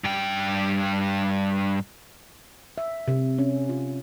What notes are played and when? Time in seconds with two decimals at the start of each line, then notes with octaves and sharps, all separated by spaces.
0.04 G2 G5
2.78 E5
3.08 C3
3.39 C#4
3.69 F4